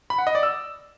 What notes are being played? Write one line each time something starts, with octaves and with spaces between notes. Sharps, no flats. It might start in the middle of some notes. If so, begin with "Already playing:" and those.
B5
F#5
D#5
D5
E6